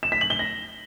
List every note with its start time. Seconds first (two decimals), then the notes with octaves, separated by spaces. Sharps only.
0.03 E7
0.12 B6
0.21 F#7
0.30 G7
0.39 A#6